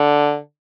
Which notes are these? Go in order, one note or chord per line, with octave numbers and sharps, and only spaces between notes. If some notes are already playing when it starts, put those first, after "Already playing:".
Already playing: D3